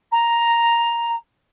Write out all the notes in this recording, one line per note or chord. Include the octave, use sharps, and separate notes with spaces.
A#5